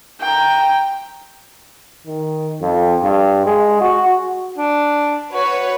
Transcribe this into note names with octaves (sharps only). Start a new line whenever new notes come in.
G5 A#5
D#3
F2
G2
G#3
F#4
D4
F#4 B4 C#5